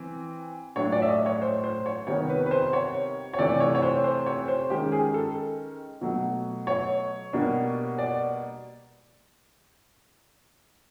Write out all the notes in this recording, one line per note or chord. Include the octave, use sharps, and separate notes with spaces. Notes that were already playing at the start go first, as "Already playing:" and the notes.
Already playing: E3 C4
A2 F#3 A3 D4 C#5
D5
E5
D#5
C#5
C5
C5
C#5
C3 D#3 G3 B3 C#5
B4
B4
C5
C#5
C#5
C3 E3 A3 D5
C#5
C#5
C5
C5
C#5
C5
D#3 G#3 C#4 G4
G#4
A4
B2 F#3 A3
C#5
B2 G3 A#3 D4
D5